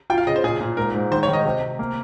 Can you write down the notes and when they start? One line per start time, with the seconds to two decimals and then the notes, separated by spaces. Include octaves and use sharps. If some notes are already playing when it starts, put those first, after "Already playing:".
0.10 F4 G5
0.18 F5
0.27 C#3 D#5
0.36 C5
0.44 A#2 G#4
0.61 A#2
0.77 G#2 A#4
0.94 G#2
1.11 D#3 C5
1.23 C#5
1.28 D#3
1.33 D#5
1.45 C3
1.62 C3
1.79 A#3